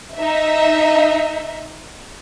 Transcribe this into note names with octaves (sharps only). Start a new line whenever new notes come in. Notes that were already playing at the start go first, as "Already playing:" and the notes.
D#4 E5